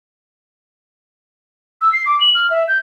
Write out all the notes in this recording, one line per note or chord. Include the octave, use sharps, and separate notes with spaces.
E6
C7
D6
F#7
F6
E5
G6